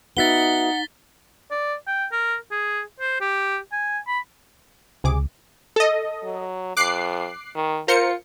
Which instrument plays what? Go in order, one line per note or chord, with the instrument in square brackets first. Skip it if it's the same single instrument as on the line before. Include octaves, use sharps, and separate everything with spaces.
[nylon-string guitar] B3 F#4 E5 [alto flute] D#4 [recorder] F#5 [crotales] A6 B6 G7
[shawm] D5
G5
A#4
G#4
C5
G4
G#5
B5
[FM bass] C#2 [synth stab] C3 G#4 D6
[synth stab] A4 D#5
[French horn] F#3
[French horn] F2 [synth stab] D6 F#6 C7
[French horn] D#3
[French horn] F4 [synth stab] A#4 C5 C#7